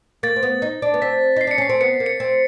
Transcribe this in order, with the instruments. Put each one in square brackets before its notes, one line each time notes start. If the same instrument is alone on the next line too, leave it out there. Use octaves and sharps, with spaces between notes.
[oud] A#3 [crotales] A6
[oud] C4
B3
D#4
D4
B3
[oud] C4 [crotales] B6
[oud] D#4 [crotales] C7
[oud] D4 [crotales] C#7
[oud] C#4 [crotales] C7
[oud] C4
[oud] B3 [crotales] C#7
[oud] A#3
[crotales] C#7
[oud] C4